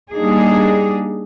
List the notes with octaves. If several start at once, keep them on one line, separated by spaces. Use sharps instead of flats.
G3 A#3 D4 D#4 G#4